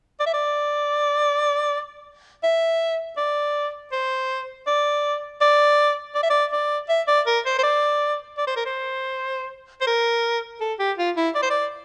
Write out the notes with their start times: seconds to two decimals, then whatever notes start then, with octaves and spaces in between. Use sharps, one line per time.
0.20 D5
0.26 E5
0.34 D5
2.43 E5
3.17 D5
3.92 C5
4.67 D5
5.41 D5
6.15 D5
6.23 E5
6.30 D5
6.53 D5
6.89 E5
7.08 D5
7.26 A#4
7.46 C5
7.59 C5
7.63 D5
8.38 D5
8.47 C5
8.56 A#4
8.66 C5
9.81 C5
9.87 A#4
10.61 A4
10.79 G4
10.98 F4
11.17 E4
11.35 D5
11.43 C5
11.50 D5